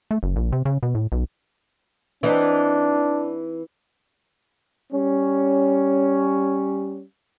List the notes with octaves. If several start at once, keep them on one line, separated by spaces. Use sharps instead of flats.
A3
F#1
A#1
C3
C#3
B2
A2
B1
E3 C4 D4 D#4
G3 C#4